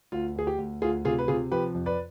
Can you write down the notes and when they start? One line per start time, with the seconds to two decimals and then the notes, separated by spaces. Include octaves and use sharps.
0.12 D2 F4
0.36 D2 G#4
0.47 G4
0.58 D2
0.82 D2 F4 G#4
1.05 C3 F4 G#4
1.19 B4
1.28 C3 F4 G#4
1.51 F3 G4 B4
1.75 F2
1.86 B4 D5